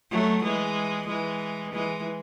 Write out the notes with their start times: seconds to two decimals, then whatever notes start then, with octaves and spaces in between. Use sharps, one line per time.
0.11 F#3 A3
0.43 E3 G#3
1.08 E3 G#3
1.73 E3 G#3